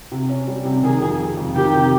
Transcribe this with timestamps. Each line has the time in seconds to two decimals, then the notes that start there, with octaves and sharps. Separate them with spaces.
0.12 C3
0.29 C#4
0.47 G3
0.65 C3
0.83 D#3 G#4
1.02 F2
1.20 G#3
1.37 F2
1.55 D#3 G4
1.74 C3